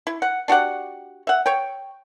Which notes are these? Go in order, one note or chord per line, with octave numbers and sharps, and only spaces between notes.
E4
F#5
D4 F#4 G4 F#5
E5 F#5
C#5 G5